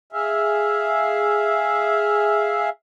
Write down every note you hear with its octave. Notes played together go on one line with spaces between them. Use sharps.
G#4 E5 F5